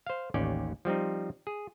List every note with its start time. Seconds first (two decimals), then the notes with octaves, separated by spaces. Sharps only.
0.07 C5 F5
0.34 A1 D#2 C#4 D5 G5
0.85 F3 G3 C4 D#4
1.47 G#4